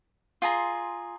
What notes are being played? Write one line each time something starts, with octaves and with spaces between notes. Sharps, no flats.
F4 G#4 A#5 C6